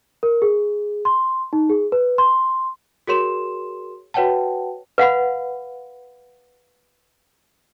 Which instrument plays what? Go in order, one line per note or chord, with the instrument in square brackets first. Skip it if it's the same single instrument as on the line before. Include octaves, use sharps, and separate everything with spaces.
[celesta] A#4
G#4
C6
D#4
G#4
B4
C6
F#4 G#4 A#4 C#5 C6 E7
F#4 B4 C#5 F#5 G5 A5
[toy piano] B4 F5 F#5 B5